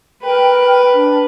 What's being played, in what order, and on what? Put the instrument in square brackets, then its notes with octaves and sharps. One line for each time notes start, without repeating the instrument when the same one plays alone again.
[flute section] A#4 G5 [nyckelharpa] B4
[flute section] D4